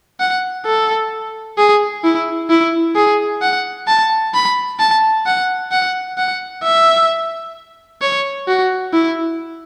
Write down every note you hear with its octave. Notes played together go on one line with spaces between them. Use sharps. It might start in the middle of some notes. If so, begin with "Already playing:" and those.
F#5
A4
G#4
E4
E4
G#4
F#5
A5
B5
A5
F#5
F#5
F#5
E5
C#5
F#4
E4